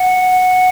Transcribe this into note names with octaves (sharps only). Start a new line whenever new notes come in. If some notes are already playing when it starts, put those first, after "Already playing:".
Already playing: F#5